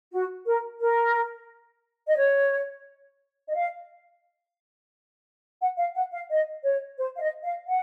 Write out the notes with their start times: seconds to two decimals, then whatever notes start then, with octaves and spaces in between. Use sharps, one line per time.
0.12 F#4
0.46 A#4
0.80 A#4
2.07 D#5
2.17 C#5
3.48 D#5
3.55 F5
5.61 F#5
5.78 F5
5.95 F#5
6.13 F5
6.30 D#5
6.64 C#5
6.98 C5
7.17 F5
7.21 D#5
7.45 F5
7.67 F#5